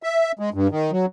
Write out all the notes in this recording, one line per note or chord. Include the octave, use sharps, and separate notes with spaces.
E5
G#3
G2
D#3
F#3